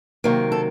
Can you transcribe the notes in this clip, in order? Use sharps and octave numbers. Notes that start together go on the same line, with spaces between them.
C3 D#3 F#3 A#3
A4